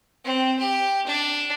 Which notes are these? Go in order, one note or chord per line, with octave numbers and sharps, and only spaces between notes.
C4
G4
D4